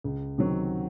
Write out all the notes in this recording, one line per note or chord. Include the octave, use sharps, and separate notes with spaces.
C#2
C3 D#3 F#3 C4